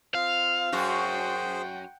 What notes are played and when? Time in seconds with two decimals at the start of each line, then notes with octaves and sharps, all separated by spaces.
0.15 C4 F4 F5
0.73 F#2 F#4 G#4 C5 F#5 G5